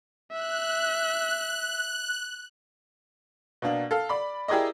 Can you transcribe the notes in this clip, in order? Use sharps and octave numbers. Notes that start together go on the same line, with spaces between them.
E5 F#6
B2 A#3 D4
A4 F5
D5 B5
E4 G4 G#4 A#4 D5 D#5